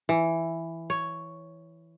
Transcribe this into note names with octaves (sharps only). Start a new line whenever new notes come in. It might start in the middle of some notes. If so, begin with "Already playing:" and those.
E3
C#5